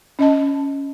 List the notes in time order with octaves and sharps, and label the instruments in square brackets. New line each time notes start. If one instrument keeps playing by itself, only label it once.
[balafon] C#4 D#5 A5